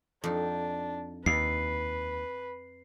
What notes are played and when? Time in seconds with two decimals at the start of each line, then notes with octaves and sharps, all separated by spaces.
0.24 F2 D4 D#4
1.26 D#2 B4 C7